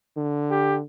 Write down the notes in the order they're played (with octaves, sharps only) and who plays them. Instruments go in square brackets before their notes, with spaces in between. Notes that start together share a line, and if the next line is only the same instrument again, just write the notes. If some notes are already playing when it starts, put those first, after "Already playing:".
[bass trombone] D3
[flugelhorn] G4